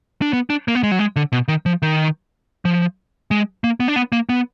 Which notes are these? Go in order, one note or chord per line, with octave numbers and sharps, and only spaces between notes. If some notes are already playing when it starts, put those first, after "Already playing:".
D4
B3
D4
A#3
B3
G#3
F#3
G#3
D3
B2
D#3
F3
D#3
F3
G#3
A#3
B3
D4
B3
A#3
B3